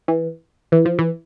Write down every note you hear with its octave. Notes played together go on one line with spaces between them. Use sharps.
E3
E3
F3
E3